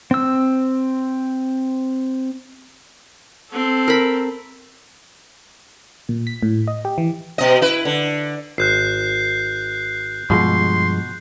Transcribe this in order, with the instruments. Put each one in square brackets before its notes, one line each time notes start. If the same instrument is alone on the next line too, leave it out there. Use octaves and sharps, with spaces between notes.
[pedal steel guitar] C4 E6
[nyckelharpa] C4 A4
[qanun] A#4 B5
[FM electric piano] A#2
B6
A2
D#5
G4
E3
[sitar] B2 D#5
E4 B4
D3
[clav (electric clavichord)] G#1 [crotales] F#6 G6 C7
[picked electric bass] G2 F3 G#3 [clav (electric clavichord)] B2 [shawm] C6